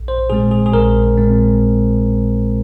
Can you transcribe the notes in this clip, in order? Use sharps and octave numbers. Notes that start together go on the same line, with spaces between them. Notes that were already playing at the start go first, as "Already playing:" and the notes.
Already playing: A#1
C5
A#2 G#3 C4 G#4
G#4
G#4
A#1 A#4
A#2 G#3 C4